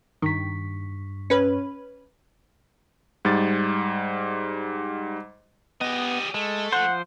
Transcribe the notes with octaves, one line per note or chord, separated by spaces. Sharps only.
G2 D#3 C#6 B6
C#4 B4
G#2 G3 A6
G3 B3 D#5
G#3 A3
F3 C5 F#5